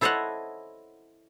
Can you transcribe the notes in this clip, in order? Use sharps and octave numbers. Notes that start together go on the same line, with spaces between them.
E4 A4 C5 C#5 D#5 F#5